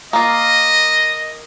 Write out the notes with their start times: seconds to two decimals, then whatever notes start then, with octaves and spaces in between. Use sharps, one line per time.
0.13 A#3 F4 D#5